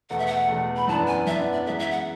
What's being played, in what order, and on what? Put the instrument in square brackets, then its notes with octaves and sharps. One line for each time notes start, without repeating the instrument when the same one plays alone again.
[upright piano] E2 B2 A3 [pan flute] F#5
[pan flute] E5
F#5
[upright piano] E2 B2 A3
[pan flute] B5
[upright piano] F#2 E3 B3 D4 [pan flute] A5
[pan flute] G#5
[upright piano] F#2 E3 B3 D4 [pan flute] E5
[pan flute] D5
[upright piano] F#2 E3 G#3 B3 [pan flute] E5
[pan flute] E5
F#5